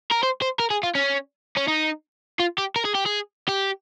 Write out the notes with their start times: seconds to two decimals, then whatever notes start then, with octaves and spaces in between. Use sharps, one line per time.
0.11 A#4
0.23 C5
0.42 C5
0.60 A#4
0.71 G#4
0.83 F4
0.95 C#4
1.57 C#4
1.67 D#4
2.40 F4
2.58 G4
2.76 A#4
2.85 G#4
2.95 G4
3.05 G#4
3.48 G4